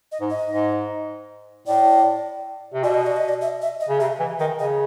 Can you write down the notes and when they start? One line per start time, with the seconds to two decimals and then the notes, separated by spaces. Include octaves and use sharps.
0.12 D#5
0.21 G#2
0.30 D#5
0.50 G#2
1.66 A2 D5
2.73 C3
2.84 B2 D5
2.94 D#5
3.06 D5
3.16 D#5
3.29 D5
3.41 E5
3.62 E5
3.80 D#5
3.89 C#3
4.00 C3 E5
4.19 E3
4.39 D#3 D#5
4.59 C#3 D#5